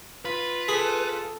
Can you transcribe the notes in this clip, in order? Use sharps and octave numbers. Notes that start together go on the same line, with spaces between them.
F4 B4
G#4 A4